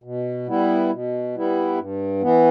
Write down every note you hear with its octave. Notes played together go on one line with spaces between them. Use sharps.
B2
G3 B3 E4
B2
G3 B3 E4
G2
E3 B3